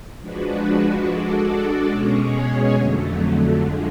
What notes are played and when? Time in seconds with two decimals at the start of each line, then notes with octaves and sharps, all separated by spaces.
0.20 F3 G#3 D4 F#4 B4
1.04 G#3 D4 F#4 A4 D5
1.88 B2 G#3 C#4 G#4 C#5
2.73 F2 D3 F#3 A3
3.57 D3 F3 G#3